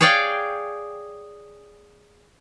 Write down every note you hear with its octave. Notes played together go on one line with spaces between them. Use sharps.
G#4 C#5 D5 F5 G5